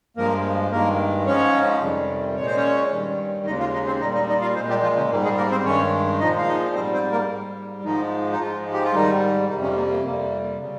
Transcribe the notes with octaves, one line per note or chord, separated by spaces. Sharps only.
G2 F3 G#3 A#3 A#4
G2 D#3 G#3 A#3 A#4
G#2 F3 G#3 C#4 C#5
F2 C3 D#3 G3
A#2 G#3 C#5
C5
C#4 C#5
G2 D#3 G3
D#2 C#3 G#3 D#4 D#5
F4 F5
D#4 D#5
C4 C5
A#2 G3 D#4 D#5
D#4 D#5
D#4 D#5
F4 F5
A#2 G#3 C4 C5
G3 G4
F3 F4
C#3 C#4
G#2 G3 A#3
G#3 G#4
A#3 A#4
C4 C5
G2 D#3 G#3 C#4 C#5
A#2 F3 G#3 D#4 D#5
F5
D#4 D#5
G#2 G3 C4 C5
C4 C5
A#3 A#4
G#2 G3
G#2 D#3 F3 G#3 D#4
D#4
G#2 F3 G#3 F4
G4
F4
G#2 D#3 G3 D#4
F2 C3 D#3 G3 D#4
C#3 C#4
A#3
A#3
F2 C3 G3 A#3
C#3 G3